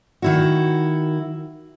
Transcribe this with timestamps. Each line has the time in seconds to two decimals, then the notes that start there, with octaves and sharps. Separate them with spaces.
0.22 D#3 E4 F#4